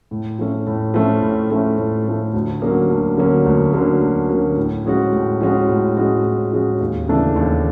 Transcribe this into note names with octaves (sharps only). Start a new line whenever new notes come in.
A2
F3 A3 C#4
A2
F3 A3 C#4
A2
F3 A3 C#4
A2
F3 A3 C#4
D2
D3 F#3 A#3 C#4
D2
D3 F#3 A#3 C#4
D2
D3 F#3 A#3 C#4
D2
D3 F#3 A#3 C#4
A2
F3 G#3 C#4 F#4
A2
F3 G#3 C#4 F#4
A2
F3 G#3 C#4 F#4
A2
F3 G#3 C#4 F#4
D#2
C#3 E3 A3 D4
D#2